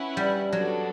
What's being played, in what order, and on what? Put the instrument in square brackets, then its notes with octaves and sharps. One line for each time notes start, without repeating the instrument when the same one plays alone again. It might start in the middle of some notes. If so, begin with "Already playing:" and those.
Already playing: [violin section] C#4 E4 B4 F#5
[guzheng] G3
[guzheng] F#3 [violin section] B3 D4 F#4 A4